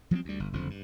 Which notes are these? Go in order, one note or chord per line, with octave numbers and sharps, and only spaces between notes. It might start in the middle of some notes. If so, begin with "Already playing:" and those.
F3 F#3 A3 C4
D2 G3
G1
F#1 F2 D3 F3
G2